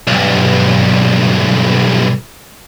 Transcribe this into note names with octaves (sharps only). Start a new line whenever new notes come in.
B1 G2